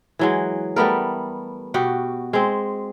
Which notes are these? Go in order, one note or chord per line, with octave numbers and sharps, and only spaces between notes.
E3 F#3 G#3
G3 A3 B3 A#4
B2 F#4 G4 F#5
G#3 C4